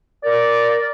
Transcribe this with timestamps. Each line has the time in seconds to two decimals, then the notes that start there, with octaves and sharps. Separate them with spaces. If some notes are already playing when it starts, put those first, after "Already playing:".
0.24 A#4 D5